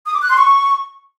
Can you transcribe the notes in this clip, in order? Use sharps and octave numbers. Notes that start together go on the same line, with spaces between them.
D#6
D6
F#6
C6
C#6